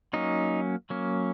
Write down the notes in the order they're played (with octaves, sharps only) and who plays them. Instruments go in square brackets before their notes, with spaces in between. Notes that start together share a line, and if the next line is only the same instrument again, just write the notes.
[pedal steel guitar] F#3 A#3 C#4 D#4
F#3 A#3 C#4